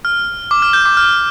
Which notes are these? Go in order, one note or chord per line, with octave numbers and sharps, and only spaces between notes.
F6
D6
F6
G6
D6
F6